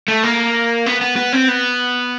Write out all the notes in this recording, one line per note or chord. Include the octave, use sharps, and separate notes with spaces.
A3
A#3
B3
B3
B3
C4
B3